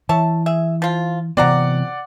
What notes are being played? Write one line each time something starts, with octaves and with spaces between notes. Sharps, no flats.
E3 C#5 E5 A5
G#4 E5
F3 F4
C3 E3 B3 C4 F#4 D5 F#5 A#5